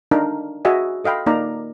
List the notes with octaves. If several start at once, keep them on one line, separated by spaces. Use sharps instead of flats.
D4 D#4 A#4 F5
F#4 G#4 D#5 E5 G#5
A4 D#5 F5 G5 B5
A#3 D#4 D5 F5 A#5